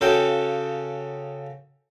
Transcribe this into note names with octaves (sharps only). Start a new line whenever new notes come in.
C#3 F#4 A4 F5 G5